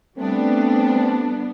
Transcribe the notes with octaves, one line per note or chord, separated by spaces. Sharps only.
G3 A3 B3 C4 D4